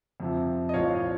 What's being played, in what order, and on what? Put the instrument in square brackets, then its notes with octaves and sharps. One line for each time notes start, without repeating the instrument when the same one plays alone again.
[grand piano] F2 C3 F3
D#5
C2 A#2 F3 C#5 F5